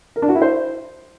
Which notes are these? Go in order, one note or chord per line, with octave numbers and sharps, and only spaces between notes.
A#4
D4
F#4
E4
C5